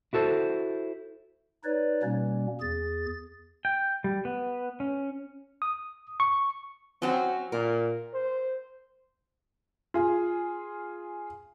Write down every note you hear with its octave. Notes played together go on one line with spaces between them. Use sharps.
E4 F#4 A4 C5
D#4 B4 C#5 D5
B2 G3 A#3 C#4
E2 G#4 A6
G5
G3
B3
C#4
D#6
C#6
F#3 C4 C#4 F#4
A#2 A#4
C5
F4 G#4